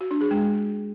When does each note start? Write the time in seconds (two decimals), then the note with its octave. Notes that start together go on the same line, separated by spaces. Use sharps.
0.01 F#4
0.11 D4
0.21 G#4
0.31 G#3